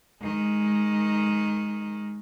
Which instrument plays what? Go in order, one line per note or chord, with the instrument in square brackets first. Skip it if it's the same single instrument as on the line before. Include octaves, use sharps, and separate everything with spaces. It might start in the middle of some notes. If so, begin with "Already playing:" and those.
[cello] D#3 G#3